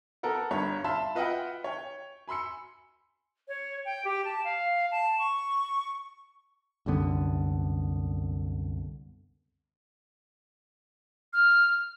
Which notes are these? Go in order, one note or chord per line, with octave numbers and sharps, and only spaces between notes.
B3 A4 A#4 F#5
G1 G2 C#5 A#5
E5 F5 A5 B5 C6
F4 B4 D#5 E5 F#5 G5
C#5 G5
G#5 B5 C6 E6 C#7
C#5
G5
G4
A5
F5
A5
C#6
C2 F#2 D3 B3
F6